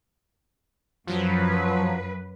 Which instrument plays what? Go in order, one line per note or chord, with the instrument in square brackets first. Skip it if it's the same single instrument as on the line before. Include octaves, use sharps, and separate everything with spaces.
[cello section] F#2 B4 [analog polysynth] F3 F#3